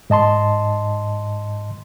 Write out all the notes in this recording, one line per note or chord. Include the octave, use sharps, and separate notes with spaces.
G#2 D#5 A5 C6